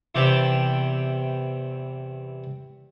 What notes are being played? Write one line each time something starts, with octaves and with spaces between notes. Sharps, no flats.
E2 C3 E4 G4 G5 A5